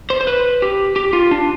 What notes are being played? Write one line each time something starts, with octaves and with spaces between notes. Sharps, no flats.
C5
C5
B4
G4
G4
F4
D4